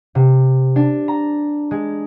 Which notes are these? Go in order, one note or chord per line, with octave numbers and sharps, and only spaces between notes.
C3
D4
A#5
G#3